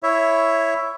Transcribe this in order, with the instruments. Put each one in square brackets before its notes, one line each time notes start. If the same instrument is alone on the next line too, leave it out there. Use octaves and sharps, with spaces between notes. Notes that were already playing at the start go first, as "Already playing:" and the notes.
[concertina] E4 C#5 E5